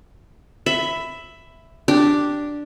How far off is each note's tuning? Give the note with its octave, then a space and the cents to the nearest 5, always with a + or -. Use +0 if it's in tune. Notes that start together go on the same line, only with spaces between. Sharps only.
E5 +0 B5 +15
D4 +0 G4 -5